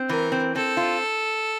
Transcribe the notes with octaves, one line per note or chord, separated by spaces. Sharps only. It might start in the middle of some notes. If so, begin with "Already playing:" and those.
Already playing: C4
E3 A#4
C4
C4 A4
F4